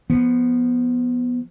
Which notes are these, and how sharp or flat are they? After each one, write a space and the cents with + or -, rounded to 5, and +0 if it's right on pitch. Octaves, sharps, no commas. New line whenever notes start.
F3 +0 B3 -5